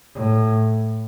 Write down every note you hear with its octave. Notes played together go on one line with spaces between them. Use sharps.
A2